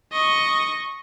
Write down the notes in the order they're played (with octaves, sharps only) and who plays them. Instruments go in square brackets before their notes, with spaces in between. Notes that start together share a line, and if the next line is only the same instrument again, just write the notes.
[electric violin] D#5 C#6